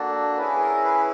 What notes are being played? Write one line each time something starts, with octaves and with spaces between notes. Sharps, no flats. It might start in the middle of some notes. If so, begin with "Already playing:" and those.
Already playing: A#3 D4 F#4 A4
C#4 E4 G#4 B4
A#4
B4